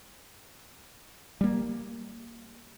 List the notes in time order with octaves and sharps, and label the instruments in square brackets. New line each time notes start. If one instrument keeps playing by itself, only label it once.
[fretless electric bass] G3 A#3